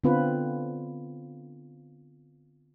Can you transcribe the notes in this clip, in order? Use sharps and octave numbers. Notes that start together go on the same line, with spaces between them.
D3 B3 C4 F4 B4